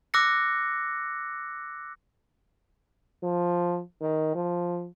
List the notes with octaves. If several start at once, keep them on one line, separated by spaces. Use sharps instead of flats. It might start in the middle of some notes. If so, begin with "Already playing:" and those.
D6 E6 F#6 A#6 C#7
F3
D#3
F3